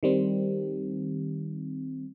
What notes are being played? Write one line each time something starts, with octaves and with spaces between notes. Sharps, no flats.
D#3 G3 C4